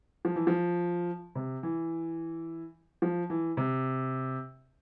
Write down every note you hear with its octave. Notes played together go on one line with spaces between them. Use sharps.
F3
E3
F3
C3
E3
F3
E3
C3